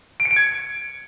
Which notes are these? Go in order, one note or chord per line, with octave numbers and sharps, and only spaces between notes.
D7
C#7
D7
G#6